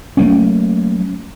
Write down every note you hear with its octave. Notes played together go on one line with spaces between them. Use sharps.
F#3 A3 A#3 C#4